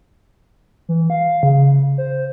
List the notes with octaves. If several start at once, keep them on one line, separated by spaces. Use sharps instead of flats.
E3
F5
C#3
C5